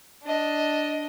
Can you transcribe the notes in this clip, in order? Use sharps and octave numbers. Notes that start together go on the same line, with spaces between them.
D4 D#5